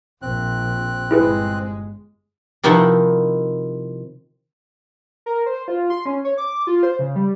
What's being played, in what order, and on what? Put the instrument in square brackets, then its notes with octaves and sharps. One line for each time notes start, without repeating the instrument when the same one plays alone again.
[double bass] A#1 [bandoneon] C4 F#6
[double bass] G1 G#3 [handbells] E4 G#4 B4
[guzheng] C3 D#3 F3 D#4 E4 F#5
[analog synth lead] A#4
C5
F4
C6
C#4
C#5
D6
F4
C5
C#3
G3